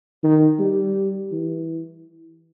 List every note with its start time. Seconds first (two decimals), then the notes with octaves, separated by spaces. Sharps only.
0.24 D#3
0.59 G3
1.32 E3